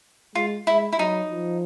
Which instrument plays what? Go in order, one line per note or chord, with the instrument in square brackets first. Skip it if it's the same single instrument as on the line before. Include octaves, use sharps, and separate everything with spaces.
[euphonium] G#3 [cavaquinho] F4
[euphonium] G#3 [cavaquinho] E4
[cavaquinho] E4
[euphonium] F#3 [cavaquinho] D#4
[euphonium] F3